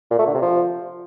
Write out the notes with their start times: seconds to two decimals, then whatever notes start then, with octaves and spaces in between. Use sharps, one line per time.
0.11 A#2
0.18 A3
0.26 D3
0.34 C3
0.42 F3